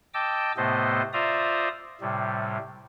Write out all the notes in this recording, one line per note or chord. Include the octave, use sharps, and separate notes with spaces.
D#5 G5 A5 D6 E6
A2 C3 A3 B3 C5 D#5
F4 C5 D5 E5 A#5 D#6
A2 C3 G3